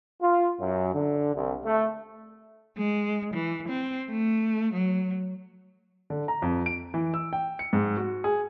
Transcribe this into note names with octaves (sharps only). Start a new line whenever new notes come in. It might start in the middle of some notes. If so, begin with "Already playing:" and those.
F4
F#2
D3
C2
A3
G#3
E3
C4
A3
F#3
D3
A#5
F2
D7
E3
E6
G5
C#7
G#2
F#4
G#4